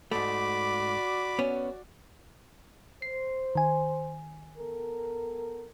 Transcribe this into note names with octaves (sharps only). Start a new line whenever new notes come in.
G#2 A3 F#4 D5 B5 D6
B3 C#4
C5 C7
D#3 G#5
B3 A4 A#4